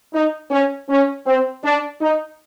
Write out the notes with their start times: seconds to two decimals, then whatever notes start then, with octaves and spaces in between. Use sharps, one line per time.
0.14 D#4
0.51 C#4
0.89 C#4
1.27 C4
1.64 D4
2.01 D#4